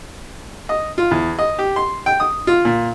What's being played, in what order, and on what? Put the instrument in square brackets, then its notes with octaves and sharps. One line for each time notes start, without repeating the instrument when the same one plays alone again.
[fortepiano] D#5
F4
E2
D#5
G4
C6
G5
D#6
F4
A#2